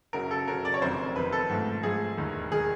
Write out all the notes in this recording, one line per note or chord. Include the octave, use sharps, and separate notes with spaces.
F#1 F#2 C#3 F#3 A#4
A4
F#1 F#2 C#3 F#3 A#4
D5
C#5
F1 F2 C3 D#3 C5
F1 F2 C3 D#3 B4
A4
G#2 F3 A3
G#2 F3 A3 G#4
E1 D#2 D#3
D#3 G#4